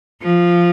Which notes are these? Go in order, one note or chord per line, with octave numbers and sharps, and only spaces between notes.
F3